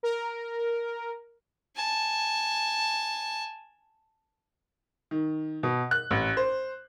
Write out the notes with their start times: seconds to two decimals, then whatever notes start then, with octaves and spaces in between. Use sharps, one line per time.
0.03 A#4
1.75 G#5 A5
5.11 D#3
5.63 B2
5.91 F#6
6.11 A1
6.37 C5